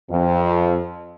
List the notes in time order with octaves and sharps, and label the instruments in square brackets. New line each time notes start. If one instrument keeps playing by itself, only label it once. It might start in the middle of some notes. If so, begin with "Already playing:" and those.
[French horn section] F2